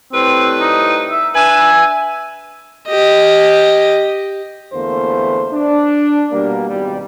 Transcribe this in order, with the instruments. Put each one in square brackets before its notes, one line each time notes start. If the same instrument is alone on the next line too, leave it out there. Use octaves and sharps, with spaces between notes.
[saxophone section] A2 G3 B4 [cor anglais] C4
[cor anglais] D#4
E5
[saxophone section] D4 B4 [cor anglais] E5 [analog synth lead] G#5
[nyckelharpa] G4 D#5
[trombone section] E2 D3 A3 A#3 C5
D4
B2 G3 A#3
G#1 B2 G3